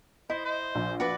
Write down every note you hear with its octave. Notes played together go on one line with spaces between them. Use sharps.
E4 C5 D#5
C5
A#1
F#4 B4 D5